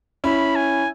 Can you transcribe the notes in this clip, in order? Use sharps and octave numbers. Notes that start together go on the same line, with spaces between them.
C#4 E4 B5
G#5